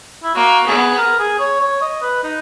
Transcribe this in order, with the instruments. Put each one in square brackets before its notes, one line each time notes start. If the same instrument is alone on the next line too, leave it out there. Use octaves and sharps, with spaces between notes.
[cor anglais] E4
[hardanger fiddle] A#3 [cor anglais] F#4
[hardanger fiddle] B3 [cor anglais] G#4
[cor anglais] A#4
G#4
C#5
C#5
D#5
B4
D#4